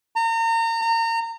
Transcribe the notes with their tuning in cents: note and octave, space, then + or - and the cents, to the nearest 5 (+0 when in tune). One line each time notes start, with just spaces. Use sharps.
A#5 -35
A#5 -30